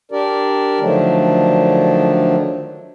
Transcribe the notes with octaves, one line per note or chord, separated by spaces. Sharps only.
D4 G4 A#4 D5
D3 D#3 F3 F#3 A3 D4